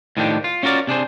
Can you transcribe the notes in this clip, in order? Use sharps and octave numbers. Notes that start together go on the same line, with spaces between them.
A2 D#3 F3 D4 G4
F4
C#4 F4 F#4 A#4 D5
C3 D4 G#4 C5